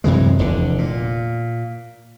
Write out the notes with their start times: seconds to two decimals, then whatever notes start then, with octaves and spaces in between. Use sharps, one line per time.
0.04 F#2 C3 E3 G#3
0.39 F1 E2 D3
0.78 A#2